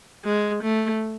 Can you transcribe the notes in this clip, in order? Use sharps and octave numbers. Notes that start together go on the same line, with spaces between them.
G#3
A3